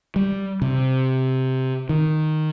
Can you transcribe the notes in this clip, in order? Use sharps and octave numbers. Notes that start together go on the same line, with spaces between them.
G3
C3
D#3